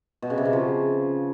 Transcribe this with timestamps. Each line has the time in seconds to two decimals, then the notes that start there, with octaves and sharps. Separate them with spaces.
0.22 B2
0.30 C#3
0.38 C3
0.45 C#3
0.53 F3